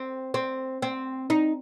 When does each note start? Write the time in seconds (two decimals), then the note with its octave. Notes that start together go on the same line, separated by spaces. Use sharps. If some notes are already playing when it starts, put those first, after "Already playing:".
Already playing: C4
0.34 C4
0.82 C4
1.30 D#4